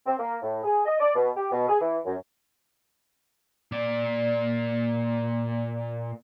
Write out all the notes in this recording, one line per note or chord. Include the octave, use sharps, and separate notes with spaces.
C4
A#3
A2
G#4
D#5
D5
B2
G4
B2
G#4
E3
F#2
A#2 D5